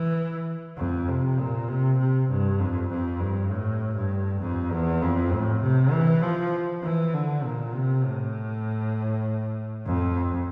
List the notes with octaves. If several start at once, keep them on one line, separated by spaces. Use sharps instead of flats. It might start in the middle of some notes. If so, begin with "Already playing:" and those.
Already playing: E3
F2
C3
A#2
C3
C3
G2
F2
F2
G2
A2
G2
F2
E2
F2
A2
C3
E3
F3
E3
D3
A#2
C3
A2
F2